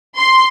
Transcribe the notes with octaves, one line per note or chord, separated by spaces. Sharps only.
C6